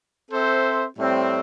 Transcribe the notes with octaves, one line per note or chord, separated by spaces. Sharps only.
C4 A4 C5 E5
A2 G3 C4